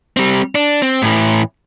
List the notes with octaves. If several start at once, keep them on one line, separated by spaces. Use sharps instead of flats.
G3 C4
D4
C4
A2 E3